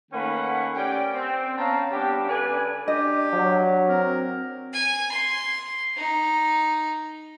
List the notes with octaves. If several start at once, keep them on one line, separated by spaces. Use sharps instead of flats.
D#3 A3 A#3 C#4 B4 F#5
C#4 G4 D5 G5
C4
B3 C#4 F5 G5 A5 A#5
G3 B3 D4 G4
C#3 A4 B4 D5 G#5
D4 G4 D#5
F#3
C4 A#4
G#5
C6
D#4